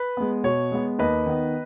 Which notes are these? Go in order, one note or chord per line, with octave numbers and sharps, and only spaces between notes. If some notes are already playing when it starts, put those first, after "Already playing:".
Already playing: B4
G#3 B3
B2 C#5
G#3 B3
D#2 B4 D#5
D#3 B3